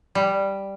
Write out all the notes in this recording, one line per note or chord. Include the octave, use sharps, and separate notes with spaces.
G3